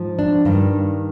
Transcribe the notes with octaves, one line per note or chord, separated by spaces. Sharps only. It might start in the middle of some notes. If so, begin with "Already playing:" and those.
Already playing: G#2 F3
D4
G2 D#3